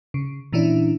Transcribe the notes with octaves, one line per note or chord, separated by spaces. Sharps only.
C#3
A#2 E3 C#4 D4 E4